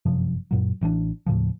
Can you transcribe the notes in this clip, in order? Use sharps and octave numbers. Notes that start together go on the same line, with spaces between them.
G1 F#2 C3 F3
F#2 A#2 F#3
A1 E3 G#3 D4
D#2 A2 C#3 F3